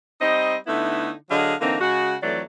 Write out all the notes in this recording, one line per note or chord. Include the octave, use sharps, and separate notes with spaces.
G3 C4 D#4 D#5
D3 A3 B3 D#4 E4
D3 F#3 G#4 D#5 F5
D3 E3 A#3 C4 D#4
C#3 G#3 F#4
F2 E3 F#3 A3 D5